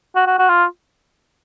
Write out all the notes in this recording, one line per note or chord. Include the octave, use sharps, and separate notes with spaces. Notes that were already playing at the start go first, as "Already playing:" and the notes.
F#4
F#4
F#4
F4